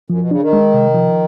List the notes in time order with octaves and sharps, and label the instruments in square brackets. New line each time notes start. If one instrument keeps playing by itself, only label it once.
[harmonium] F#2 [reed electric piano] F3
[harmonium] B2
[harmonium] C#3 [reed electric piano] D4
[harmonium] D#3
[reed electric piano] G#3
C3
F3